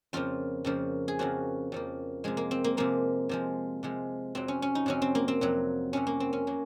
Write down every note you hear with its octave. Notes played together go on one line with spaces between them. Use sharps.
F2 C#3 F3 A#3 F4
F2 C#3 F3 A#3
G#4
F2 C#3 F3 A#3 F#4
F2 C#3 F3 A#3
C3 F3 G#3 G#4
A#3
C4
A#3
C3 F3 G#3 A#3
C3 F3 G#3
C3 F3 G#3
F2 C3 F#3 C4
C#4
C#4
D#4
F2 C3 F#3 C#4
C4
A#3
C4
F2 C3 F#3
F2 C3 F#3 C#4
A#3
C4
C#4
F#3 A#3